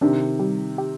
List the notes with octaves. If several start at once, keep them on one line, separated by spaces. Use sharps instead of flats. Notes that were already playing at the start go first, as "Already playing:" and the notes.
C3 D#3 D4
G3
G4